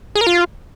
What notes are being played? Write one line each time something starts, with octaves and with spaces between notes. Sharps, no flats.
G#4
A#4
F4